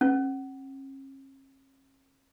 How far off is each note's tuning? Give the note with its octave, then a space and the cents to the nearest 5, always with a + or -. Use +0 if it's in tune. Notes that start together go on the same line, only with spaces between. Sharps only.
C#4 -45